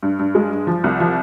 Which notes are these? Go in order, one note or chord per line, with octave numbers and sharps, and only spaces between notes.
G2
G2
G#3
G2
F3
C2
F3